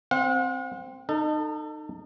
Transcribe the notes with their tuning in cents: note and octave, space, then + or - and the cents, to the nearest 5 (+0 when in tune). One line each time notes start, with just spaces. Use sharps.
C4 +0 F#5 -45
D#4 -25 A4 +25